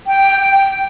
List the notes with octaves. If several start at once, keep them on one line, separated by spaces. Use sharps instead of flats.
G5
G5